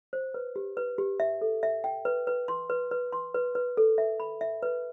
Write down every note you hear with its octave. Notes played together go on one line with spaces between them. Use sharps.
C5
B4
G4
B4
G4
E5
A4
E5
G5
B4
B4
C6
B4
B4
C6
B4
B4
A4
E5
B5
E5
B4